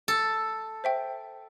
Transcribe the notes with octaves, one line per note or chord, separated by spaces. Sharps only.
A4
C5 E5 G5